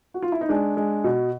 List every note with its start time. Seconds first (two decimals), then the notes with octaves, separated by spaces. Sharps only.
0.14 F#4
0.22 F4
0.32 E4
0.41 D#4
0.49 G#3 D4
0.77 G#3
1.04 B2